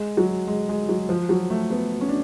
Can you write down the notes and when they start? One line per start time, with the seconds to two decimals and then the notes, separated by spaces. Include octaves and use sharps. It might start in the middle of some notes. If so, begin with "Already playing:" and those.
Already playing: G#3
0.17 F#3
0.47 G#3
0.69 G#3
0.89 F#3
1.09 F3
1.29 F#3
1.50 A3
1.70 B3
2.01 C#4
2.09 D4